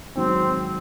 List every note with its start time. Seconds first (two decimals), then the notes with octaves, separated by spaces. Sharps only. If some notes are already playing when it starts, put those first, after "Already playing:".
0.16 G#2 D#3 F#3 C4